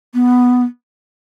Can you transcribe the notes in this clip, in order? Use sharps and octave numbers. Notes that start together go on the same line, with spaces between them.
B3